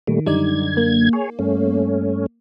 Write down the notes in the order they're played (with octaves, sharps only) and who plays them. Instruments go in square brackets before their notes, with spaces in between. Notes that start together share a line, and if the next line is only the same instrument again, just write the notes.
[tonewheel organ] A#2 G3 A3 [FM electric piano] D#3
[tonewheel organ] F#2 D3 G#6 [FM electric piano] G3 D#4 D5
[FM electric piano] A#3
[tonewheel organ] G#4 C#5
G2 A3 C#4